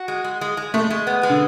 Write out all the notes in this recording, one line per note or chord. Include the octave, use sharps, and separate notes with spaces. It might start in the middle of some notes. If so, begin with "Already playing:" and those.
Already playing: F#4
G#3
G#3
G#3
G#3
G#3 A3
G#3
B3
G#3
D3